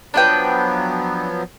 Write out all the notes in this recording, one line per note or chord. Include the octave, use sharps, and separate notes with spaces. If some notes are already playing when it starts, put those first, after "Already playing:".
F3 F#3 B3 D4 B4 G5